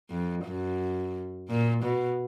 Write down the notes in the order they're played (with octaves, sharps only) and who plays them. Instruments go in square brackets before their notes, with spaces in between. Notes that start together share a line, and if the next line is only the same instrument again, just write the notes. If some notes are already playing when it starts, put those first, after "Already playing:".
[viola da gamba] F2
F#2
A#2
B2